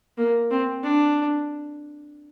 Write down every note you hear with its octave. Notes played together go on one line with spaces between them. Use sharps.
A#3
C4
D4